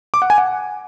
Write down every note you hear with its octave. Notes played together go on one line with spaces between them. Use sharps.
D6
F#5
G#5
F#5